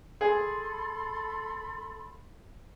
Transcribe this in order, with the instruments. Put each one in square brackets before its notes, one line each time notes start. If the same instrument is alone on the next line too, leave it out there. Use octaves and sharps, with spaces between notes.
[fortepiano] G#4 [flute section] A4 B5 C6